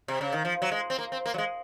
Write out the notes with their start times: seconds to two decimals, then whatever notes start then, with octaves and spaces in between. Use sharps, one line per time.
0.08 C3
0.21 C#3
0.33 D#3
0.45 F3
0.62 F#3
0.72 G#3
0.90 C4
0.99 A#3
1.12 C4
1.26 A#3
1.34 F#3
1.38 G#3